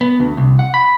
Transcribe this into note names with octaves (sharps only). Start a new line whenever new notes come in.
B3
D2
C2
F#5
B5